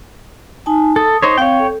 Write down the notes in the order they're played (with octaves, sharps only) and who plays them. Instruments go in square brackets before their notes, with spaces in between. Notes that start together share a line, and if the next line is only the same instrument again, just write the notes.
[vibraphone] D#4 G#5 A5
[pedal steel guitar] A4 [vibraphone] D#6
[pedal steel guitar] D#4 C5 C#5
[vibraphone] C4 F5 [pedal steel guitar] C#5 G5
[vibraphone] A4